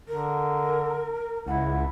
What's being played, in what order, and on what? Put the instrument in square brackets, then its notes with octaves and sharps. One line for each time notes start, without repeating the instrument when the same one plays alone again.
[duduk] D3 [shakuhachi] A#4
[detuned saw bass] C#2 [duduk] E4 [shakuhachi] F#5